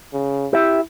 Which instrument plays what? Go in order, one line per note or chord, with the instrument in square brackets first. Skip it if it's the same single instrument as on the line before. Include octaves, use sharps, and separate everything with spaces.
[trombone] C#3
[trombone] E4 [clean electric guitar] G4 E5